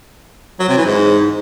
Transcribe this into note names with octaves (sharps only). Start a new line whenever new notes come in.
F#3
C3
E3
G#2